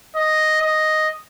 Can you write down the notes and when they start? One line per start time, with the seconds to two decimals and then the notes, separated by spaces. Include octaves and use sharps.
0.16 D#5
0.61 D#5